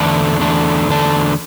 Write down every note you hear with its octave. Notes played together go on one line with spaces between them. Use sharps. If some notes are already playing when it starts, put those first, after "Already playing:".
Already playing: E2 D3 A3 D4
E2 D3 A3 D4
E2 D3 A3 D4